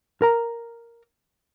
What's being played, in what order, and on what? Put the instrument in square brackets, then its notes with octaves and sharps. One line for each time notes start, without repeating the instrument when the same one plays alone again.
[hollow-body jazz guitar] A#4 A#5